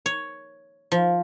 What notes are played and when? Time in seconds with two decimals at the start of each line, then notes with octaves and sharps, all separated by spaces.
0.06 C#5
0.92 F3